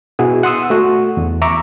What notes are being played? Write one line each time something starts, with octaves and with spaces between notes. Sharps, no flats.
B2 E4 F#4 G#4 F#5
F#5 C6 D#6 E6
A3 F#4
E2
E5 A#5 C#6 D6